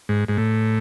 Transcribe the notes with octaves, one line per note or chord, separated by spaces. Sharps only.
G#2
G#2
A2